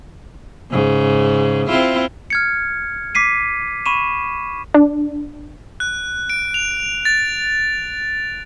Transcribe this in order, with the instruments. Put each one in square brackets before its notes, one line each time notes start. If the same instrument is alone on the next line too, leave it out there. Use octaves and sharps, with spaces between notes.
[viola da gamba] G#2 C#3
C4 E4 F4
[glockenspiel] F6 G#6 C#7
D6 B6 C7 D#7
B5 C#6 D#7 E7
[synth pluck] D4
[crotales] F#6
D7
F7
A6